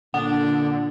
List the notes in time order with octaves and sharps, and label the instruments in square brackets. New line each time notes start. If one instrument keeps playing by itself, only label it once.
[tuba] A#2 [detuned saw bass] D3 [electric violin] D4 [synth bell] F#5